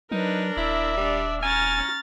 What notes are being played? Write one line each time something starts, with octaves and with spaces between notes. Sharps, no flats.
F#3 D4 D#4 A#4 B4
D#1 E4 D5 E5
G3 D4
C#4 G#5 A#5 F6 A6